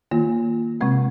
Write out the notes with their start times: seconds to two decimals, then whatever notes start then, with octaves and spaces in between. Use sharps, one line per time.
0.11 D#3 A#3 F4
0.81 C3 G#3 C4